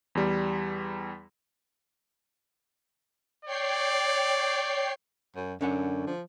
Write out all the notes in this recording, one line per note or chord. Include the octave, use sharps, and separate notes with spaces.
E2 G3
C#5 D5 G5 C7
F#2
F#2 D3 C#4 F#5
F3